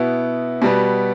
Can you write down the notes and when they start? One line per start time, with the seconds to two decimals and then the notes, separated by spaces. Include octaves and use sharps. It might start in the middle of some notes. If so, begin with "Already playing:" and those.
Already playing: B2 B3 E4
0.62 B2 G3 B3